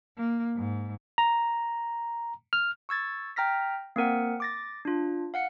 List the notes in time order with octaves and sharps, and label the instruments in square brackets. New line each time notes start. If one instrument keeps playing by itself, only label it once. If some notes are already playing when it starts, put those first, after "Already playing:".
[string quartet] A#3
G#2
[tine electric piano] A#5
F6
[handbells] C#6 E6 G#6 A6
G5 A#5 F6 A#6 B6
A#3 C4 A#4 F#5
D6 A6 A#6
D4 F4
F5 F#5 C#7